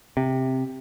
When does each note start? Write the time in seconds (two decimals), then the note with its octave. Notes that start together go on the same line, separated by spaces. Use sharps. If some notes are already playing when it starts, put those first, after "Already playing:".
0.17 C3